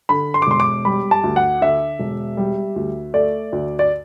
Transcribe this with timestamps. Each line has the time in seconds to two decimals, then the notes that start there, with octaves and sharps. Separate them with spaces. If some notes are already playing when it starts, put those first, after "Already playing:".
0.09 D3 B5
0.34 C6
0.42 D6
0.47 E1 C6
0.60 D6
0.85 G3 B5
1.11 A5
1.24 D2
1.36 F#5
1.61 D3 E5
1.99 E1
2.37 G3
2.76 D2
3.14 A3 D5
3.53 D2
3.79 D5